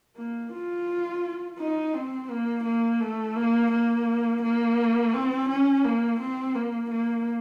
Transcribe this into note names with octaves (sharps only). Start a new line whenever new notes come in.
A#3
F4
D#4
C4
A#3
A#3
A3
A#3
A#3
A#3
C4
C#4
A#3
C4
A#3
A#3